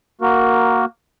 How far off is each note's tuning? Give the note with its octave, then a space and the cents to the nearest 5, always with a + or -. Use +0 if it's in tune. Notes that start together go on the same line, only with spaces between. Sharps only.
A#3 +0 F#4 +0 A#4 +0